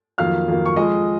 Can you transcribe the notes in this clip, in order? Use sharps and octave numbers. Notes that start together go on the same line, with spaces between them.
F2 D#3 F#3 A#3 F5 F6
F2 D#3 F#3 A#3
C#6
F2 F3 G#3 D#5 D#6